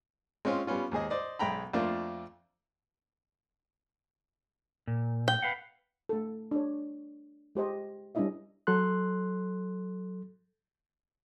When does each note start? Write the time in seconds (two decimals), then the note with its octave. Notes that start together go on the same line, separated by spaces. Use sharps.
0.45 G#3 C4 C#4 F4
0.67 G3 B3 C#4 F4
0.91 D#2 G#2 G#4 D#5
1.10 C5 D5 D#5
1.39 B1 G#3 G5 A#5 B5
1.73 F2 A3 A#3 D4 F4
4.87 A#2
5.28 G5
5.43 B4 F5 F#5
6.09 A3 A4
6.51 D4 C#5
7.55 G#3 G4 C5 D#5
8.15 G3 C#4 D4 E4 D#5 E5
8.67 F#3 A4 C6 F#6